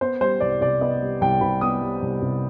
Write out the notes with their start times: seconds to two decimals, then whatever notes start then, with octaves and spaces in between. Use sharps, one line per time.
0.01 B3 C5
0.21 G3 C5
0.40 C2 D5
0.61 C3 D5
0.81 B3 D#5
1.02 G3
1.21 C2 G5
1.41 C3 B5
1.61 B3 D#6
1.81 G3
2.02 C2
2.22 C3